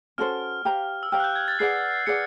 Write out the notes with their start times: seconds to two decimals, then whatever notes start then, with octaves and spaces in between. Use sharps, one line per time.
0.18 C#4 F#4 A4 C5 F6
0.65 G4 C5 F5 A#5
1.03 E6
1.12 G4 C5 F5 A#5 F6
1.20 F#6
1.24 G6
1.35 G#6
1.48 A6
1.59 G#4 B4 D5 F#5 C7
2.06 G#4 B4 D5 F#5 C#7